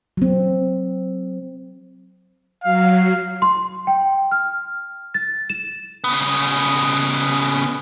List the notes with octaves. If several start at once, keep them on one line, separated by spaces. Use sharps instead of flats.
F#3 C4
F#3 F5
C6
G5
F6
A6
E7
C#3 B3